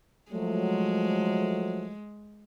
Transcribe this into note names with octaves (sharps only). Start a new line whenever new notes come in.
F3 F#3 G#3 A3